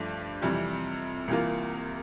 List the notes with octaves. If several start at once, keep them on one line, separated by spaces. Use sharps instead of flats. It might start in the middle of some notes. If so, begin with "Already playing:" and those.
Already playing: G2 F3 A3 D4
F2 C3 E3 G3
C2 C3 E3 A#3 F4